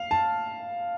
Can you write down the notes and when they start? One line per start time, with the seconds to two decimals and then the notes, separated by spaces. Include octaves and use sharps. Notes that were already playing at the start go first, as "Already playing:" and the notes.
Already playing: F5
0.11 A5